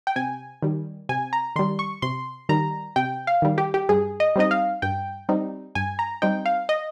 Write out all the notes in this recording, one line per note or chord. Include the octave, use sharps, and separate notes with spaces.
G5
C3 G#5
D#3 G3
C3 G#5
A#5
D#3 G3 C6
C#6
C3 C6
D#3 G3 A#5
C3 G5
F5
D#3 G3
G4
G4
G2 G#4
D#5
G3 C4 D#4 D#5
F5
G2 G5
G3 C4 D#4
G2 G#5
A#5
G3 C4 D#4 G5
F5
D#5